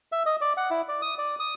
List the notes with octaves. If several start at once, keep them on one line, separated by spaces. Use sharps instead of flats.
E5
D#5
D5
F#5
E4
D5
D#6
D5
D#6